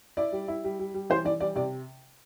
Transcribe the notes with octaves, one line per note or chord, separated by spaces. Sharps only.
E4 D5
G3
E4
G3
G3
G3
E3 C5
E3 D5
G3 D5
C3 D5